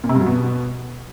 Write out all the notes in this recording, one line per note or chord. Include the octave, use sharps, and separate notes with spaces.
A#2
C3
G2
F#3
B2